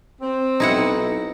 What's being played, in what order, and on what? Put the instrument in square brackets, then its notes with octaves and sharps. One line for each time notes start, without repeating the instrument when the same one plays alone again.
[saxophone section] C4
[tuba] B1 [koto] D#4 E4 F#5